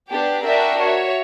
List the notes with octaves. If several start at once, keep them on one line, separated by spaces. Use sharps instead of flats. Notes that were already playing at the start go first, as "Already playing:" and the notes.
B3 D4 G4
D4 F#4 A#4 E5 G5
F#4 C#5 E5